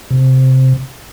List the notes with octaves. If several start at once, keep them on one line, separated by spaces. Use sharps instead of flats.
C3